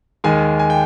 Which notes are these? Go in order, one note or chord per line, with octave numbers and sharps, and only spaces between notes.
D#2 D#3 G#3 G#5
G#5
G5